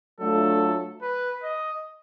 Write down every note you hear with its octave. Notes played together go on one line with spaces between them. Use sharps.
F#3 A3 D4 F4 A4
B4
D#5